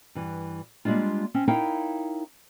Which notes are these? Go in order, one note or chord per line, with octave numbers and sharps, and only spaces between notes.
G2 E3
G3 G#3 A#3 D4 F4
C4 C#4
D#4 E4 A#4 C#5 F5 G5